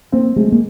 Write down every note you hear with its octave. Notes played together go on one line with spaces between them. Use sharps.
A#3 C4
G#3 A3
A#3